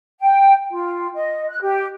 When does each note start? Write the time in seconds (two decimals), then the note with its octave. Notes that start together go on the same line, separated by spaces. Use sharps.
0.20 G5
0.70 F4
1.15 D#5
1.49 F#6
1.61 G4